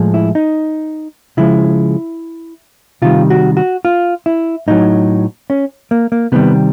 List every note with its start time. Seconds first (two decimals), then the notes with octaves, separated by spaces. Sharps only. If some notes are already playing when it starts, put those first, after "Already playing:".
Already playing: A2 F3 G#3
0.14 E4
0.35 D#4
1.37 C#3 F3 G#3 E4
3.02 C3 D#3 G3 F4
3.30 F#4
3.57 F#4
3.85 F4
4.26 E4
4.68 A2 F#3 D#4
5.50 C#4
5.91 A#3
6.12 A#3
6.32 C3 D#3 G3 B3